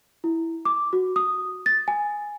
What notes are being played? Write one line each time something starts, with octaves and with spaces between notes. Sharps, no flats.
E4
D6
F#4
D#6
A6
G#5